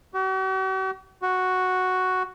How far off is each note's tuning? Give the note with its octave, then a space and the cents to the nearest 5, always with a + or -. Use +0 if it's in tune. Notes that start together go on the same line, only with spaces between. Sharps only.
F#4 +45
F#4 +0